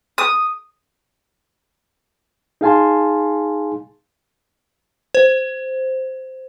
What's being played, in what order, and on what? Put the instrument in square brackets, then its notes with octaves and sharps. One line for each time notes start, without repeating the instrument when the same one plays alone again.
[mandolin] D#6
[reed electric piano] D#4 G#4 F5 G#5 A5 C6
[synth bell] C5